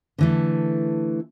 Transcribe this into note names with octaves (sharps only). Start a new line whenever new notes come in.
D3 E3 A3